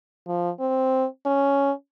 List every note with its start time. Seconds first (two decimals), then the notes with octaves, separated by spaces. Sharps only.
0.27 F3
0.60 C4
1.26 C#4